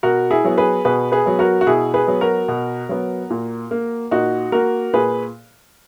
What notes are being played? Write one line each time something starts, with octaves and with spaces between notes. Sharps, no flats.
B2 F#4 A#4
E4 G#4
F#3 B3
G#4 B4
B2 G#4 B4
G#4 B4
F#3 B3
F#4 A#4
F#4
B2 E4 G#4
G#4 B4
F#3 B3
F#4 A#4
B2
F#3 B3
A#2
A#3
A#2 D#4 F#4
A#3 F#4 A#4
A#2 G#4 B4